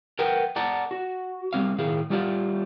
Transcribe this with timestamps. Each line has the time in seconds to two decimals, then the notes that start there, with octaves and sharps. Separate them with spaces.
0.19 A#4 B4 F#5 G5
0.56 A4 D5 F#5 A5 A#5
0.91 F#4
1.53 G3 C4 F5
1.78 A2 D#3 G#4 F5
2.10 G3 A3 F4 G4 D5 F5